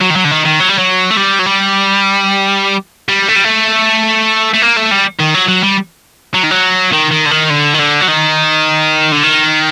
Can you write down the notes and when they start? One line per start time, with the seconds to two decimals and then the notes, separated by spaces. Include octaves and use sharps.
0.01 F#3
0.10 D#3
0.16 F#3
0.25 D3
0.31 D#3
0.45 D#3
0.60 F#3
0.69 G3
0.78 F#3
1.11 A3
1.17 G3
1.39 F#3
1.46 G3
3.09 G3
3.28 A3
3.36 G3
3.44 A3
4.54 A3
4.62 A#3
4.77 A3
4.91 G3
5.19 D#3
5.34 F#3
5.48 F#3
5.63 G3
6.34 F#3
6.44 D#3
6.51 F#3
6.93 D#3
7.11 D#3
7.26 D3
7.31 D#3
7.50 D3
7.74 D#3
7.79 D3
8.01 F#3
8.07 D#3
9.12 D3
9.23 D#3